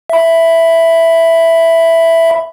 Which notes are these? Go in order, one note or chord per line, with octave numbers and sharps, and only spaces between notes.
E5 B5